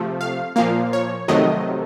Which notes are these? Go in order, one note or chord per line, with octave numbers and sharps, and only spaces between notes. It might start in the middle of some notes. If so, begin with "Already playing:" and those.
Already playing: C3 F3 A3
F5
A#2 F3 A#3 F5
C#5
F2 C3 D#3 F#3 A3 D#5